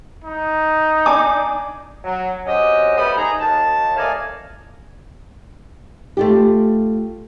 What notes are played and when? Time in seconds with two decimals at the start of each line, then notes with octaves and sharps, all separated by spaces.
0.24 D#4
1.06 D4 G#5 D6
2.04 F#3
2.46 F#3 C4 C#4 G4 D#5
2.97 G3 A3 B3 C5 B5 D#6
3.16 D#4 G#4 A#5
3.40 D#2 A5
3.97 A3 A#4 D5 D#5 F5 G#5
6.17 A3 F4 G4